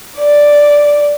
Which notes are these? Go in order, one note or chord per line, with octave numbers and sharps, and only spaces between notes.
D5